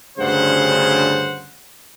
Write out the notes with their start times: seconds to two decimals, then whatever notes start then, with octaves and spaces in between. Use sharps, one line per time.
0.18 D2 G2 C#3 C5 F#5